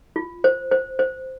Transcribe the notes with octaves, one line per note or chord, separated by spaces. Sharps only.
F4
C5
C5
C5